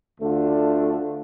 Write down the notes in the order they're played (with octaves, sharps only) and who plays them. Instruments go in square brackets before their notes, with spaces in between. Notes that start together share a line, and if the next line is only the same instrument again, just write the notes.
[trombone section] D2 D3 A3 D4 F4